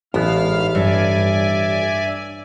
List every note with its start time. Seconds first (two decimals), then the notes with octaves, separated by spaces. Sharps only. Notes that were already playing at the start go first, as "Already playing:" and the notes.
0.14 A1 G#2 B3 E4 F5 F6
0.75 G2 D5 E5 G#5